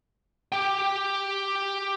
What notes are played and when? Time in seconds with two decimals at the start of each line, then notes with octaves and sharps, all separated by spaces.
0.52 G4 G5